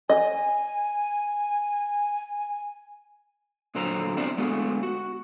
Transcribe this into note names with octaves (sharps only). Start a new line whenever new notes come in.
D#5 G#5
A#2 D3 F#3 C5 A#5
B3 C4 D4 C5 D5 E5
D3 G#3 A3 B3 F#4
F#4